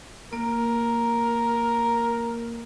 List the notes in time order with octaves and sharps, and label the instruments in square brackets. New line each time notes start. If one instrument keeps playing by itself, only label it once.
[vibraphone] A#3 [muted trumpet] A#4